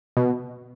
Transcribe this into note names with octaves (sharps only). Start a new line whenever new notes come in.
B2